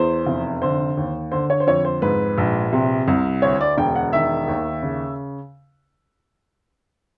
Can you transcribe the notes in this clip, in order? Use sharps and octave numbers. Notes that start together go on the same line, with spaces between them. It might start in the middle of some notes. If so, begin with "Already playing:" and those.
Already playing: E2 C5
F1
D3 C5
D#2
D3 C5
C#5
C5
F2 C#5
C5
G#2 B4
A#1
C3
C2
D2 C#5
D5
E1 G5
F#5
D#3 E5
D#2
C#3